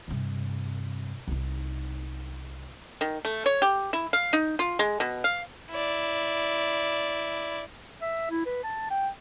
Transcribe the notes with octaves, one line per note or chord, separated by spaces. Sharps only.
G2 C3
C2 D#4
D#3
A3
C#5
G4
E4
F5
D#4
F4
G#3
B2
F5
E4 D5
E5
E4
B4
A5
G5